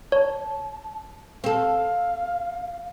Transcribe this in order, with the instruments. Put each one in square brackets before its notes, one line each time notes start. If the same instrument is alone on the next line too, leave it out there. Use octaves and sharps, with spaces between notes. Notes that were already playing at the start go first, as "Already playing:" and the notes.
[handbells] C#5 [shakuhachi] A5
[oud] C4 A4 [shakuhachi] F5